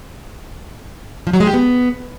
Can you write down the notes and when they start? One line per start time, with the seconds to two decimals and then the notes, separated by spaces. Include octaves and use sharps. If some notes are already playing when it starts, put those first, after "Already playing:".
1.27 F3
1.33 F#3
1.40 G#3
1.47 G4
1.54 B3